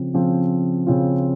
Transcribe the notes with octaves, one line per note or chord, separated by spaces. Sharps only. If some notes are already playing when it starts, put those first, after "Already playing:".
Already playing: C#3 F3 C4
C#3 F3 C4 F4
C#3 F3 C4 F4